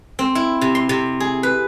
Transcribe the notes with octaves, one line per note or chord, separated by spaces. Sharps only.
C4
E4
C3
C6
C3
G#4
B4